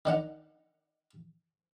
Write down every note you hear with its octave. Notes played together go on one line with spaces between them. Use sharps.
D#3 D4 F#5 A#5